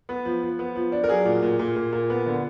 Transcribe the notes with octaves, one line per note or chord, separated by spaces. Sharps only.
B3
F3
F3
B3
F3
D4
A#4
F#3 G#4
A#2
A#2
A#2
A#2
A#2
B3
D3